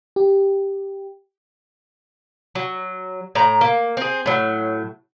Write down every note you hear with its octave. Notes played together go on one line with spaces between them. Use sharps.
G4
F#3
A2 A#5
A#3
C4 G#4
A2 F#3